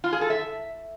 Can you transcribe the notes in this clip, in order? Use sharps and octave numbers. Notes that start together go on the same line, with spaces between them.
F4
G#4
A4
E5